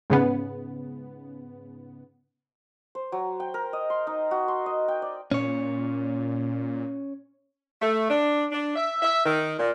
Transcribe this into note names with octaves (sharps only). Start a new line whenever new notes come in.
G#2 C#3 B3
C5
F#3
G5
A#4
D#5
C6
D#4
F#4
C6
D#5
G5
D5
A#2 C#4 C#5
A3
D4
D4
E5
E5
D#3
A#2